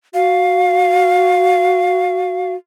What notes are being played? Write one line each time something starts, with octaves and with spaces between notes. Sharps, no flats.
F#4 F5